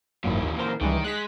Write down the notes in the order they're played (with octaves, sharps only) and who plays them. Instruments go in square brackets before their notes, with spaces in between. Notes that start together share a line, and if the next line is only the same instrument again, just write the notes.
[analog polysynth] G#1 F#2 [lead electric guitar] A#2 E3
[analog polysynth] D#2
A#4 C5
[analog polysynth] C#2 E3 G3 [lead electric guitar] D#3
[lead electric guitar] G#3 [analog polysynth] F#6 B6